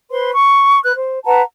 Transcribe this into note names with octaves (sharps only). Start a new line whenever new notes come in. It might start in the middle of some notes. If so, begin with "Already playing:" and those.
B4 C5 C6
C#6
B4 F#6
C5
B4 F#5 A5 A#5